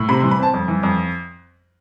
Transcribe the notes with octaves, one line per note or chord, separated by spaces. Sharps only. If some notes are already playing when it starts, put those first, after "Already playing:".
Already playing: A2
C3 B5
C6
E3
B5
C4 A5
F2
E3
F2